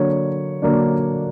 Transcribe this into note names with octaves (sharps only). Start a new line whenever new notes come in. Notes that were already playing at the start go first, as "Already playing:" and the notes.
Already playing: D3 F#3 A#3 D4 C#5
D3 F#3 A#3 D4